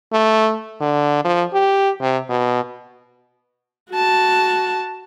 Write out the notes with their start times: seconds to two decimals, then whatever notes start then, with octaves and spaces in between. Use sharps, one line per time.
0.13 A3
0.81 D3
1.25 F3
1.53 G4
2.01 C3
2.29 B2
3.91 F#4 A5